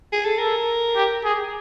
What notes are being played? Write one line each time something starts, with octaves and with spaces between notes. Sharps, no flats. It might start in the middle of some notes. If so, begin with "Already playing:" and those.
G#4
A4
A4 A#4
G4
G#4